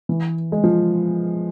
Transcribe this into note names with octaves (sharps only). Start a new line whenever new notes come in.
E3
G#3
F3